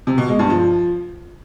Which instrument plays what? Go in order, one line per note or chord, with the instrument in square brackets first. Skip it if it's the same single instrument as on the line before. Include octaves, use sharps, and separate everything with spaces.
[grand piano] C3
B2
G#3
G2
F3